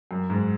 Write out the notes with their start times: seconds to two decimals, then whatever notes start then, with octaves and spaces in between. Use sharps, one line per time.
0.11 F#2
0.30 G#2